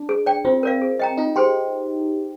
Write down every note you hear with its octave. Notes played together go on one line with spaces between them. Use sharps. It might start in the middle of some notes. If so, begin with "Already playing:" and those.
Already playing: D4
G#4
D5 G5
C4 F4
A#4 D5 F5
G#4
D#5 G5 A#5
D#4 F4
G4 G#4 C5 G5 C6